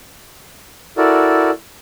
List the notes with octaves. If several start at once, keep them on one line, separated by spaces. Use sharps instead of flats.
E4 F#4 A4 A#4 D5